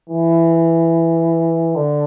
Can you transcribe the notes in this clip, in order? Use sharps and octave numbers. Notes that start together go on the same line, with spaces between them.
E3
D3